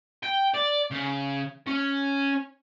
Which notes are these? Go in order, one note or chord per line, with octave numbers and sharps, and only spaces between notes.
G5
D5
C#3
C#4